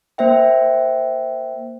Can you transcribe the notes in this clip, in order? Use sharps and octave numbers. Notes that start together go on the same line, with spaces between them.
A#3 C5 E5 G5